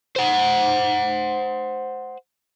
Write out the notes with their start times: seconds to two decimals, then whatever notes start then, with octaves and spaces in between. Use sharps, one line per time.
0.16 C5 F#5